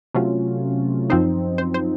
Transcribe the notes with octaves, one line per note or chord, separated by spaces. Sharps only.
C3 F#3 A3 C#4 F4
F#2 F3 C4 D#4 C5
C5
C5